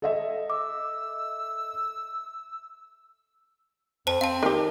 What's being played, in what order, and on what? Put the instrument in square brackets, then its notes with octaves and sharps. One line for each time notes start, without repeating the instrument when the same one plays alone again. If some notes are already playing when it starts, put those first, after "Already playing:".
[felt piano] A4 D#5 E5
[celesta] D6 [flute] E6
[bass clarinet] F2 [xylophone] C5 A5
[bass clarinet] C4 [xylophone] F5 A5
[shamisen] D#3 G4